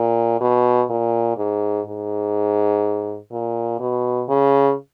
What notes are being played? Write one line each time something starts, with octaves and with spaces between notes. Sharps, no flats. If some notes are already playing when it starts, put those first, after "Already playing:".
Already playing: A#2
B2
A#2
G#2
G#2
A#2
B2
C#3